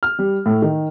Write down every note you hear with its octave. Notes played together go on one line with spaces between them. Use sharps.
F6
G3
A2
D#3